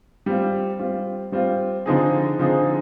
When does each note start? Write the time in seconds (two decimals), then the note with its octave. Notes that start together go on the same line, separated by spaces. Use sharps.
0.26 G3 C4 F4
0.79 G3 C4 F4
1.32 G3 C4 F4
1.86 D3 F3 C4 D#4 G#4
2.39 D3 F3 C4 D#4 G#4